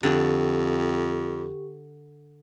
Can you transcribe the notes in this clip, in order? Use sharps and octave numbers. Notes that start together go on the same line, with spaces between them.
F2 D3 G4